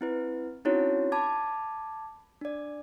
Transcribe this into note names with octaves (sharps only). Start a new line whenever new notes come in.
C4 E4 B4
C4 C#4 D#4 E4 F#4 C#5
A5 B5 D6 G#6
D4 D5